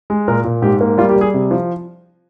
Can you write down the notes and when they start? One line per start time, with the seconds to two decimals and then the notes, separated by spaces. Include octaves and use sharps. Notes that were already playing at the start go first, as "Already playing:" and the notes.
0.10 G#3
0.28 A#2 A#4
0.44 A#2
0.62 G#2 G4
0.81 A#3
0.98 G3 F4
1.09 G4
1.16 G3
1.21 G#4
1.34 C3
1.51 F3